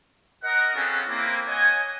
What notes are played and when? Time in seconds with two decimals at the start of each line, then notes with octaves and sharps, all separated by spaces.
0.44 A#4 D#5 F#5
0.75 C4 C#4 F4 G#4 A4 B4
1.08 A#3 C4 E4
1.48 C#5 D#5 F#5 G#5